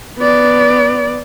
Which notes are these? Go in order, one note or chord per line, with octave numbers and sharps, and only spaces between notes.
B3 D5